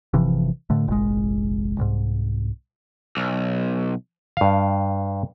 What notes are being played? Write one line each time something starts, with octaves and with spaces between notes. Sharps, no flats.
G1 C3 E3 F3
A2 D3 A3
F1 A#1 G#3
C2 G#2
B1
G2 F5